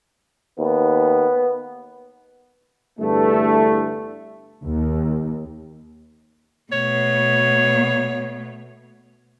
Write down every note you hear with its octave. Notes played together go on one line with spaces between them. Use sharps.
D#2 B3
E2 G2 D3 E3 A3
D#2
B2 A3 C#5